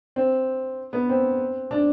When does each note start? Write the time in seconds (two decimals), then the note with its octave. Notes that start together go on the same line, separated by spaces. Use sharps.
0.16 C4
0.93 B3
1.09 C4
1.71 D4